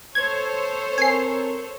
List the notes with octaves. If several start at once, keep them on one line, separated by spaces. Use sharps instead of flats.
A4 C5 C#5 G#6
C4 A#4 G#5 C7